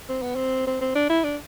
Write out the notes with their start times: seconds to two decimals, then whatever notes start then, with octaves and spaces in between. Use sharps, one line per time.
0.09 C4
0.22 B3
0.35 C4
0.67 C4
0.81 C4
0.95 D4
1.09 E4
1.24 D4